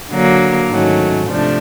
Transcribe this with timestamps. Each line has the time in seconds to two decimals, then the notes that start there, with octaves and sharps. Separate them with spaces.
0.11 D3 F#3 A#3
0.69 G#2 D#3 F#3 A3 C#4
1.28 C3 F3 A3 D4